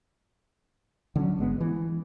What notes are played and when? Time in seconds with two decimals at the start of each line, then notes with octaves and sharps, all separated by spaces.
1.16 D3 F#3 C4 C#4
1.38 G#1 G#3 B3
1.60 E3